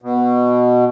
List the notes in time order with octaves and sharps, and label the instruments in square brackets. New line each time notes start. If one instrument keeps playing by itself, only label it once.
[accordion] B2